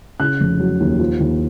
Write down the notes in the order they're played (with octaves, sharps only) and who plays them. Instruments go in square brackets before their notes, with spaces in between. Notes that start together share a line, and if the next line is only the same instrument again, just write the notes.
[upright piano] C#3 F#6
F1
F#3
D#2
F3
D#2